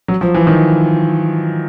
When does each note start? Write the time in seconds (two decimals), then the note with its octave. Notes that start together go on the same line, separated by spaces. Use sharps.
0.08 F#3
0.21 F3
0.34 E3
0.47 D#3